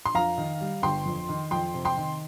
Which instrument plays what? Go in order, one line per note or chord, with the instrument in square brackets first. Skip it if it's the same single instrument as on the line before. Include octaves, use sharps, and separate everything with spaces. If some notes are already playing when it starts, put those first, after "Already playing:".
[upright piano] C6
F2 F5 A#5
D#3
G3
G1 G5 C6
F2
D#3
F2 G5 C6
C3
G5 C6
D#3